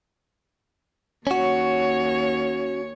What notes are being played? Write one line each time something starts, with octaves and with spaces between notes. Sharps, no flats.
D#2 C#4 F#4 C#5